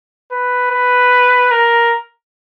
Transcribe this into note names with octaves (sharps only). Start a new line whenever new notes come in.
B4
B4
A#4